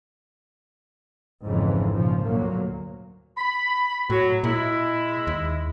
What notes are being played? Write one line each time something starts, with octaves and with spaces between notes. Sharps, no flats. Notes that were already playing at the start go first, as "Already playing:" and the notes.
G#1 F2 G#2 C#3 E3 F3
A#2 C#3 F3
D2 A#2 F#3 A#3
B5
A2 F#3
A#2 G#3 E4
D#2